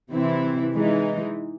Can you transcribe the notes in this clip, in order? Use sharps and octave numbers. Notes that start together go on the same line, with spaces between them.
C3 E3 C4 E4
E3 G#3 D#4